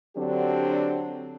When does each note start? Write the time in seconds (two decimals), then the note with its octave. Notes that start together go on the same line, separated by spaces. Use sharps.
0.17 D3 F#3 C4 D4 G4